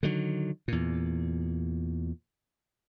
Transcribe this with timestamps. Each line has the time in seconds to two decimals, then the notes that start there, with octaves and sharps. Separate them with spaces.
0.03 D3 D#3 F#3
0.68 E2 A#2